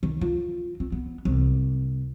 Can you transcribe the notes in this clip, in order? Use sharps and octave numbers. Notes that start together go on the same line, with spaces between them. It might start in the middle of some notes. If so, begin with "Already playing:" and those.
D#3
F4
C4
B3
C2